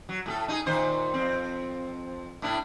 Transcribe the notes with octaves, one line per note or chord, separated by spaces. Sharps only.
F#3
A2 G#4 A4
D#4 E4 G#4
A#2 D#3 C5
F2 C4
A2 D4 E4